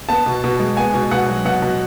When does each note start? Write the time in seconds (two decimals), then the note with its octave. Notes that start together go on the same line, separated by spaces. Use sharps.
0.09 B3 A5
0.26 B2
0.44 B2
0.60 G#3
0.77 B3 G#5
0.94 B2
1.11 B2 F#5
1.28 F#3
1.45 B2 F#5
1.62 B2